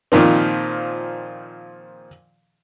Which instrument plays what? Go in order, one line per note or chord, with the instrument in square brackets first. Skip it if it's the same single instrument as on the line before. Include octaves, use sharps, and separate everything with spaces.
[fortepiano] A#2 D#3 F3 C4